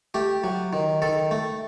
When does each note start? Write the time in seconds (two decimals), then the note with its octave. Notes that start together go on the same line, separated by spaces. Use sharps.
0.14 A3 G4
0.44 F#3
0.73 D#3
1.02 D#3 A4
1.31 A3